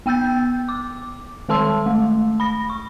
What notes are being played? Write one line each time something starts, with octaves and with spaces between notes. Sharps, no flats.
B3 G5 E6 G6 A6
D6
D#3 G#3 A4 A5 C6 E6
A3
B5 A#6
C#6